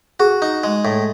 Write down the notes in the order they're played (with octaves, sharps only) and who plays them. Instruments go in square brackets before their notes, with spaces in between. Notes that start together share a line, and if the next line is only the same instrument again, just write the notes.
[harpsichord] F#4 [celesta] G#4
[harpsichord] D#4
G#3
A2